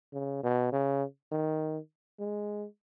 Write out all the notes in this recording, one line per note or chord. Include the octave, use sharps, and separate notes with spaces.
C#3
B2
C#3
D#3
G#3